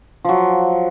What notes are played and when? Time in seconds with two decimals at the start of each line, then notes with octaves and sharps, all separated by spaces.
0.25 F3 F#3